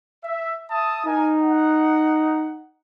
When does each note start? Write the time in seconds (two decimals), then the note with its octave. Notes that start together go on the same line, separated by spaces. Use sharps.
0.24 E5
0.71 E5 A5 D#6
1.06 D#4 A#4 G#5
1.41 F#5